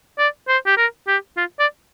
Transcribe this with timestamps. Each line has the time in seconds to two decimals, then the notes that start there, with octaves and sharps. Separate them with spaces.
0.18 D5
0.48 C5
0.66 G4
0.77 A#4
1.08 G4
1.37 F4
1.59 D5